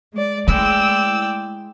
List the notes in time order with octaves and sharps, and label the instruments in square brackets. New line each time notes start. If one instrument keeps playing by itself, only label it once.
[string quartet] G#3 D5
[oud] G#3 E4 E5 [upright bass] A3 [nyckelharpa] D5 G5 [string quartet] E6